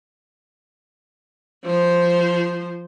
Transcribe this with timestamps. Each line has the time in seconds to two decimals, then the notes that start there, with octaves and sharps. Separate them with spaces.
1.64 F3 C5